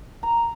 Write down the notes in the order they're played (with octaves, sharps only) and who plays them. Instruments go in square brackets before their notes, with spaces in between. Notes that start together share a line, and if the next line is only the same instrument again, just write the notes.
[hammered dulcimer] A#5